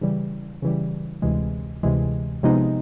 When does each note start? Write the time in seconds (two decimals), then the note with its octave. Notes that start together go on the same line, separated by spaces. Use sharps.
0.01 C#3 E3 G3
0.62 C#3 E3 G3
1.22 D2 C3 E3 G#3
1.83 D2 C3 E3 G#3
2.43 C3 F3 G#3 B3 D#4